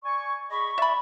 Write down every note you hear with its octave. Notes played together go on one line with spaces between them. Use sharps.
D5 G#5 C#6
G#4 D#5 B5 C#6
D5 E5 B5